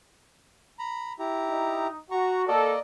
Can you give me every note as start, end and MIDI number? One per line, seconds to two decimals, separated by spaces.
0.79 1.13 82
0.79 1.13 83
1.19 1.87 64
1.19 1.87 67
1.19 1.87 82
1.50 1.96 63
2.11 2.46 66
2.11 2.42 82
2.11 2.42 85
2.48 2.74 58
2.48 2.74 69
2.48 2.79 74
2.48 2.79 75